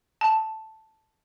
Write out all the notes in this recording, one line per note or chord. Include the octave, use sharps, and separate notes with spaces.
A5